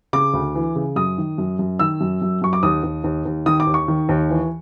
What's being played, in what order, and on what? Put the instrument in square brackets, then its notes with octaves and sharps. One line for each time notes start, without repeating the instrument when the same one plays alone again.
[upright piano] C#3 D6
D2
E3
C#3
F#2 D#6
D#3
F#2
F#2
D#3 E6
F#2
F#2
F#2 C#6
D6
D#2 D#6
D#2
D#2
D#2
D#3 D#6
D6
D#2
C#6
D#3
D#2
E3